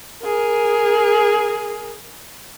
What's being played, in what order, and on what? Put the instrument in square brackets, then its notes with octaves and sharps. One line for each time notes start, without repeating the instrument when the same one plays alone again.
[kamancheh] G#4 A#4